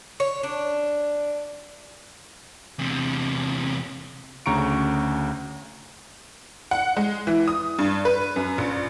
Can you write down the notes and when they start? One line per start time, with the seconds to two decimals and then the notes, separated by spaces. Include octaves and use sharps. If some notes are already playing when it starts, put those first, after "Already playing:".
0.20 C#5
0.43 D4
2.79 E2 C3
4.46 D2 C#3 A#5 C#6 C#7 D7
6.71 F#5
6.97 G#3
7.27 E3
7.48 D#6
7.79 G2
8.05 B4
8.36 F#2
8.58 A#1